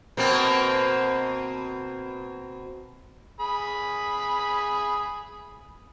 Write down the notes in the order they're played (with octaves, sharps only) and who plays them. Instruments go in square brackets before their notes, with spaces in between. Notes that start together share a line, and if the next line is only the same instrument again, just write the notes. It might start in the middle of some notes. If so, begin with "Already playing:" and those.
[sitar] B2 A#3 C4
[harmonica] G#4 B5